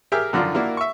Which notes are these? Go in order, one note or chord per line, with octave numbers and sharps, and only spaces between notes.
G4 G#4 A#4 E5 G5 F6
F#2 D3 D#3 F3 D4 F4
A#3 D4 E4 F#4 A#4
E5 C#6